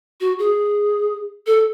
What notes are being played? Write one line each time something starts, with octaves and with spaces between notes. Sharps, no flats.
F#4
G#4
A4